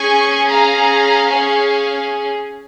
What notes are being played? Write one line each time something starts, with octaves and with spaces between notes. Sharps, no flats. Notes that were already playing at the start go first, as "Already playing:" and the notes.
Already playing: C#4 G#4 G#5 C#6
F5 A#5
C#5 F5